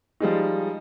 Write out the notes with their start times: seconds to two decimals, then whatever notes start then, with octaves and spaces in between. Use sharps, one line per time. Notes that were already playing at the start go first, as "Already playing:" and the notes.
0.20 F3 G3 G#3 D#4